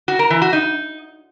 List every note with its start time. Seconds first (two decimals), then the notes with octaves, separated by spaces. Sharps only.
0.08 F#4
0.19 A#4
0.30 E3
0.42 F#4
0.53 D#4